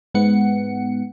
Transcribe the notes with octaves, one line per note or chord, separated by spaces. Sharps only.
G#2 B3 F#5 C#7